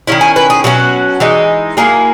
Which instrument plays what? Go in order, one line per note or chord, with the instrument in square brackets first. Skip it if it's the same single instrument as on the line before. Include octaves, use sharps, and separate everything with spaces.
[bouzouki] D#3 F#3 C#4 E4
G#5
B4
G#4
B2 F#3 A#3 C#4 F#4
E3 G#3 D#4
F#3 A#3 E4 G#4